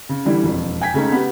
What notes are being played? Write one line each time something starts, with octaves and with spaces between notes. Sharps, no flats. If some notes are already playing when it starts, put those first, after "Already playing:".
C#3
D3 E3 G3 E4
E1 F2
G5 G#5 G#6 B6
C#3 G#3 A3 C#4 D#4
B3 G4